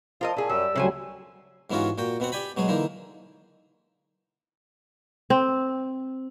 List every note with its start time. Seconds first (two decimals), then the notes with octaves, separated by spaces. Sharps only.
0.21 F3 F4 A#4 D#5
0.36 A#2 E4 G#4
0.49 F#2 G3 E6
0.75 D2 A2 C#3 F#3 G3 C5 G#5
1.70 G#2 E3 B3 C#4 F4 F#4
1.98 A#2 F#4 G5
2.20 B2 B3 C4 F#5
2.32 G4 D5 G5 G#5 B5
2.57 B2 F#3 G#3 G#4
2.68 D3 E3 A#3 D#4
5.30 C4